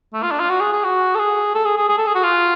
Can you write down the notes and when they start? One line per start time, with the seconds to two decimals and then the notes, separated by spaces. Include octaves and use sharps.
0.14 A3
0.23 F4
0.31 D4
0.40 F4
0.50 F#4
0.61 G#4
0.73 G#4
0.85 F#4
1.15 A4
1.19 G#4
1.54 A4
1.65 G#4
1.77 G#4
1.89 G#4
1.98 A4
2.06 G#4
2.15 F#4
2.24 F4